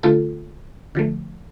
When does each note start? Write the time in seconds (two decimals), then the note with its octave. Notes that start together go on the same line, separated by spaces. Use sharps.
0.03 D3 A3 F4 A4
0.95 D3 F3 A3